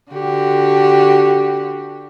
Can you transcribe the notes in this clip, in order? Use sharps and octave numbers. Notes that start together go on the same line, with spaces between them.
D3 F#4 G4